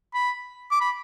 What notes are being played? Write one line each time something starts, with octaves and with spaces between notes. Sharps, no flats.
B5
D6
B5